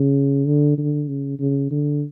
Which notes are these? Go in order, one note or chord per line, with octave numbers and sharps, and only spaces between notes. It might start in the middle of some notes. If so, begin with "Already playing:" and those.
Already playing: C#3
D3
D3
C#3
C#3
D3